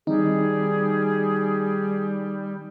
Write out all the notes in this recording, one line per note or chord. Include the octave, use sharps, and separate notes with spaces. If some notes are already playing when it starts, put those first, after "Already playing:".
D#3 G3 C4 D#4 G#4